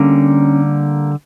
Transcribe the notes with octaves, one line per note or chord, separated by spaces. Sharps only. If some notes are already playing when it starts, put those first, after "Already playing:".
Already playing: D3 G3 A#3 C#4